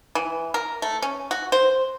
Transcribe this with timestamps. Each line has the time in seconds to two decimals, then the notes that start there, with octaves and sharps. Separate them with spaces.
0.15 E3
0.54 A#4
0.82 A3
1.02 C#4
1.31 F#4
1.52 C5